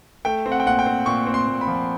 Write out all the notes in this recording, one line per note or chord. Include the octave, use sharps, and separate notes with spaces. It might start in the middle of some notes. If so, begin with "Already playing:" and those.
A3 G5
C4
F#5
G5
A#2 F#5
G5
C4
A#2 C#6
C4
C6
A#2
B5
F3